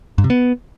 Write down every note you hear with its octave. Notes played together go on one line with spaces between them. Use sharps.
G2
C3
B3